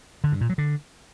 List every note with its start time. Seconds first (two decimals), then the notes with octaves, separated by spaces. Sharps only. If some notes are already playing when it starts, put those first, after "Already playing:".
0.24 D3
0.32 G2
0.41 A#2
0.49 F#3
0.58 D3